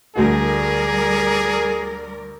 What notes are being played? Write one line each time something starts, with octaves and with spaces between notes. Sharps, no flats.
D2 G3 A3 F#4 G#4 A#4 D5